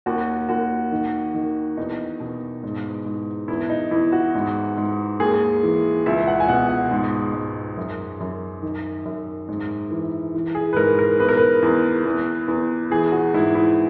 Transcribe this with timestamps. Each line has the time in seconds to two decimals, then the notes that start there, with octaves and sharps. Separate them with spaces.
0.06 D#2 F#4
0.49 D#2 F#4
0.92 D#3
1.34 D#3
1.77 E2 D#4
2.20 B2
2.63 G#2
3.06 G#2
3.48 E2 E4
3.70 D#4
3.91 E2 E4
4.12 F#4
4.35 G#2
4.77 G#2
5.20 D#2 G#4
5.63 E3
6.06 C#2 E5
6.28 F#5
6.40 G#5
6.48 B2 F#5
6.69 F#5
6.91 G#2
7.33 G#2
7.77 F#2
8.20 F#2
8.62 D#3
9.05 F#2
9.48 G#2
9.91 E3
10.34 E3
10.55 G#4
10.73 B4
10.77 G#2 A#4
10.99 A#4
11.20 E2 B4
11.29 A#4
11.37 B4
11.62 E2
12.05 E2
12.48 E2
12.90 E3 G#4
13.12 F#4
13.34 G#2 E4
13.55 E4